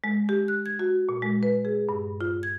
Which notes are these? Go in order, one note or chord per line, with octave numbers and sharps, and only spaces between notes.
G#3
G4
F#6
G#6
F#4
A#2
G#3
B4
G#4
G2
F4
G#6